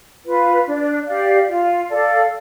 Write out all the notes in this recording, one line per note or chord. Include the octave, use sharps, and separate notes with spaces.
F4 B4
D4
G4 D5 F5
F4
A4 D5 F5